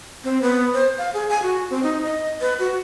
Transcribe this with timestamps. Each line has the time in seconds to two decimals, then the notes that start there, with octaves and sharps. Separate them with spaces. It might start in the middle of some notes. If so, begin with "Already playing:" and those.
0.24 C4
0.42 B3
0.74 C5
0.98 F5
1.14 G#4
1.29 G#5
1.43 F#4
1.70 C4
1.83 D#4
2.04 D#5
2.41 B4
2.59 F#4